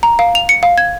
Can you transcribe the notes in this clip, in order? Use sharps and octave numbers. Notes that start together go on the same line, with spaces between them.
A#5
F5
F7
C#7
F5
G#6